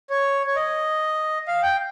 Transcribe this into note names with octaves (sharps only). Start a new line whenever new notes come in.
C#5
C#5
D#5
F5
G5